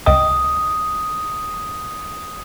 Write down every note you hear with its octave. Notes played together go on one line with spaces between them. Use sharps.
C#2 D#5 G5 D#6